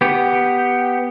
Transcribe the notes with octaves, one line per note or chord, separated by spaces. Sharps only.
B3 G4